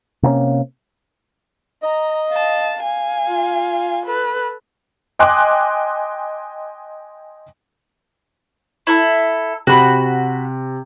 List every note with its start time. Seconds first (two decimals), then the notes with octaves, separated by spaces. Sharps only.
0.23 C3 A#3 C4 C#4
1.83 D#5 A#5
2.30 F5 A5
2.82 F5 G#5
3.27 F4
4.06 A4 B4
5.19 D#5 G5 G#5 C6 D6 F#6
8.87 E4 A4
9.67 C3 F#4 B5